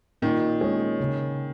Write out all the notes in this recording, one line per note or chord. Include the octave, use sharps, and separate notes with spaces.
A#2 D#3
G#3 C#4 G#4 C#5
C#3